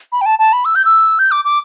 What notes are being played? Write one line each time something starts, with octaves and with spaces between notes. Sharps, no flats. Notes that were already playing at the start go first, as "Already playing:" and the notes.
B5
G5
A5
A5
B5
E6
G6
E6
G6
D6
D6